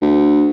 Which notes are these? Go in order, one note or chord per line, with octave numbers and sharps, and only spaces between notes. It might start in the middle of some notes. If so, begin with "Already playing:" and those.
D2